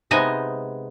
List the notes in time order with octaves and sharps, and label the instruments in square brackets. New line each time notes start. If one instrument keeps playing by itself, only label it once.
[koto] C3 G#3 B3 D#4 D#5 G#5